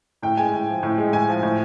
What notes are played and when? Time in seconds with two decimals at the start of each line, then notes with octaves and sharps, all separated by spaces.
0.23 A2 G5
0.37 G#3 G#5
0.53 A2
0.68 F3
0.83 A2
0.98 G#3
1.13 A2 G#5
1.29 F3
1.43 A2